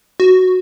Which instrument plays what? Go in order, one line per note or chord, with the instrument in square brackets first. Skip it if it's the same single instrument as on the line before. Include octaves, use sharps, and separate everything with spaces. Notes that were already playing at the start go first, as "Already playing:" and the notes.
[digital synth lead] F#4